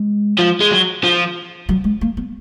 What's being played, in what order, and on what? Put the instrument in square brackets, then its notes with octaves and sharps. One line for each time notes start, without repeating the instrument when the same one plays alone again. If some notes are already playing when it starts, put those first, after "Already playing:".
Already playing: [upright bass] G#3
[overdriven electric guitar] F3
G#3
F#3
F3
[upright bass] F#3
G#3
A#3
B3